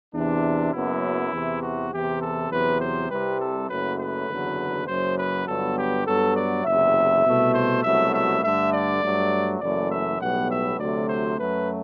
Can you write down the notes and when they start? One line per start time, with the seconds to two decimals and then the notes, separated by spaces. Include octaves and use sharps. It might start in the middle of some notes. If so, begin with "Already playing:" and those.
0.14 E2 C3 E3 D4
0.73 F#1 F#2 F#3 B3 E4
1.32 E2 C3 E3
1.62 F#4
1.93 E2 C3 E3 G4
2.21 A4
2.51 E2 C3 F#3 B4
2.81 C5
3.10 C2 C3 G3 B4
3.40 A4
3.69 F#1 F#2 F#3 A3 B4
3.99 B4
4.28 F#1 E2 D3 F#3
4.87 F#1 F#2 F#3 C5
5.17 B4
5.46 G1 G2 F#3 B3 A4
5.77 G4
6.06 G2 F#3 B3 A4
6.36 D5
6.65 F#1 E2 C3 E5
7.25 C2 B2 A3
7.54 C5
7.83 C2 B2 F#3 A3 E5
8.14 E5
8.42 G2 D3 A3 E5
8.72 D5
9.02 G2 F#3 A3
9.61 F#1 F#2 E3 A3 D5
9.91 E5
10.19 B1 A2 G3 B3 F#5
10.50 E5
10.79 D2 C3 F#3 A3 D5
11.09 C5
11.38 F#2 F#3 A3 B4